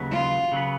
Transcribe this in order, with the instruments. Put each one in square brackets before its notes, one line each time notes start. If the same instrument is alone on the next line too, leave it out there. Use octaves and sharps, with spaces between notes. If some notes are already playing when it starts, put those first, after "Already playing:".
Already playing: [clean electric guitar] D#2 C#3 F#3 B3
[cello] F4
[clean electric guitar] C#3 F#3 B3